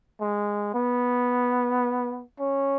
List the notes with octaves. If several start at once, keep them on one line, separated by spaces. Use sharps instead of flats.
G#3
B3
C#4